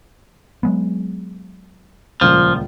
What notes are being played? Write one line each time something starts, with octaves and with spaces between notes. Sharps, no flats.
F#3 G#3 B3
D#1 C#2 A#2 F3